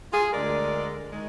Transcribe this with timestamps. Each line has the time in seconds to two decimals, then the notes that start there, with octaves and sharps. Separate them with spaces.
0.12 F4 G#4
0.32 D2 D3 G#3 A#4 D5
1.12 D#3 G#3